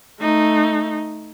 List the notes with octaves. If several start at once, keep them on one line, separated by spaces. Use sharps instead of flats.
A3 D#4